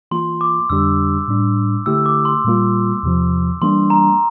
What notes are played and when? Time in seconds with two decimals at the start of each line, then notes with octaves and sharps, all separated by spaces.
0.11 E3 A#3 F4 C6
0.41 D6
0.70 F2 D3 G3 D4 G4 E6
1.28 A2 G3 D4
1.86 D3 A3 E4 G4 E6
2.06 D6
2.25 C6
2.45 A#2 G3 A#3 F4
3.03 E2 C3 F3
3.62 E3 G3 A#3 D4 C6
3.90 A#5